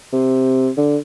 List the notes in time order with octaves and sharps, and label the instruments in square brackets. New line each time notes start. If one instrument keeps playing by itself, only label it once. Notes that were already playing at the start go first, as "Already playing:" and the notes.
[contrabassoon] C3
D3